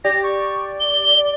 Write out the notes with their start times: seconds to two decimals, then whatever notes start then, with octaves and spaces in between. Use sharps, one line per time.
0.05 G4 D5 A#6
0.23 C#6
0.80 G7